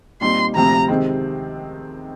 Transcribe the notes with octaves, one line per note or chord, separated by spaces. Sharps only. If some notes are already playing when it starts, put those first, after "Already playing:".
A#2 G3 C4 D#4 C6
D2 C3 F3 C4 A#5
C3 D#3 G#3 C4